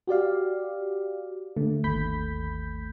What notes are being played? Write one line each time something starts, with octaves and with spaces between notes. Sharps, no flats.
F#4 G4 D5 F5
D3 A3
G#1 D#2 A3 B5 G6 B6